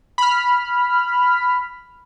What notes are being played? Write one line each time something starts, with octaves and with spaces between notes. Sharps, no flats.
B5 F6